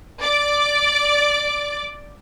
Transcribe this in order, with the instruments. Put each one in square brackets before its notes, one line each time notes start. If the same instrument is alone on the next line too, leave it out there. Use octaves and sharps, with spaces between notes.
[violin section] D5 D6